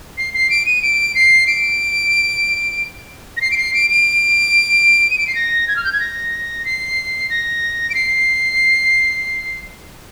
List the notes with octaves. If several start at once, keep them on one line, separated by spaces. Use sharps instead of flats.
C7
C7
D7
D#7
D7
C7
D7
A#6
C7
D7
C7
D7
D7
D#7
D7
C7
A#6
G#6
F6
G6
G#6
A#6
C7
A#6
D7
C7